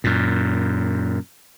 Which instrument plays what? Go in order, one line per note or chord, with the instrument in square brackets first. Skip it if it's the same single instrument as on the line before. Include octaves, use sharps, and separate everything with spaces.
[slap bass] F#2 A#2